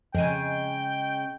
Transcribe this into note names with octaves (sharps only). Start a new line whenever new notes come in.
F2 C#3 G#3 G5 G#5